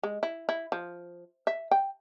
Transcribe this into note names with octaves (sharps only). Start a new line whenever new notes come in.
G#3
E4
E4
F3
E5
G5